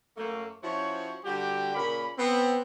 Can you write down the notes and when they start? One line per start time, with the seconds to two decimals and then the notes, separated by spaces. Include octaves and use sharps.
0.17 F#2 A3 A#3
0.63 F3 C#4 E4 F#4 C5 C#5
1.24 D3 G3 F#4 G4
1.75 A#2 C#3 A#3 C#4 B5
2.18 B3 C4